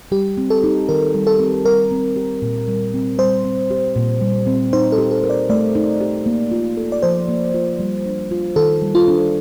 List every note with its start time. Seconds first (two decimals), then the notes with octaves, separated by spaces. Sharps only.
0.12 G3 G4
0.37 C4
0.50 A4
0.64 D#4
0.89 D#3 A#4
1.15 G3
1.27 A4
1.40 C4
1.65 G3 A#4
1.91 C4
2.16 G4
2.42 A#2
2.68 G3
2.94 C4
3.19 G3 C5
3.45 C4
3.70 G4
3.95 A#2
4.22 G3
4.47 C4
4.73 D#4 C5
4.92 A4
4.98 G4
5.11 A4
5.24 A#4
5.30 D5
5.50 A3 D5
5.75 D#4
6.01 G4
6.26 A#3
6.52 F4
6.77 A4
6.92 D5
7.02 F3 C5
7.28 A#3
7.54 F4
7.79 G3
8.06 D4
8.31 F4
8.56 D#3 A4
8.82 G3
8.95 F4
9.08 D4